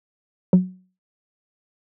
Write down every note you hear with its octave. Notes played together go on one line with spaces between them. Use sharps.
F#3